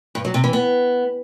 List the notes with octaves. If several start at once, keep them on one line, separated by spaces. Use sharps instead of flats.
G2
F#3
C3
E3
B3